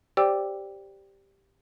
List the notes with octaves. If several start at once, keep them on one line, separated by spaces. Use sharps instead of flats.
G4 C5 D5 G5 D6 E6